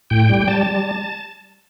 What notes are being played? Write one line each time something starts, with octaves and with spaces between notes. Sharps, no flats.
A2 G5
G3
G5
G3 A5
G3